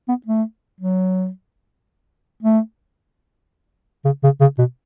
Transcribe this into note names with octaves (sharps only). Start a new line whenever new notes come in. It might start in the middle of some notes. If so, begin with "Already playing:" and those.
B3
A3
F#3
A3
C#3
C#3
C#3
B2